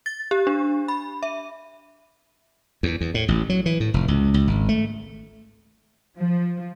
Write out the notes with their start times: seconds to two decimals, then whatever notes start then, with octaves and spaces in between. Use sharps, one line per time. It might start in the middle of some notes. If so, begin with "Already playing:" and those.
0.06 A6
0.31 G4
0.47 D4
0.88 B5
1.23 E5
2.83 E2
3.01 E2
3.14 A2
3.28 A1
3.50 F#3
3.66 E3
3.80 A2
3.94 F1
4.08 C#2
4.34 C#2
4.47 G#1
4.69 A3
6.18 F3